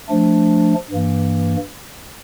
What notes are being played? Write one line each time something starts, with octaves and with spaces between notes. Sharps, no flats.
F3 A3 D4
G2 E3 A#3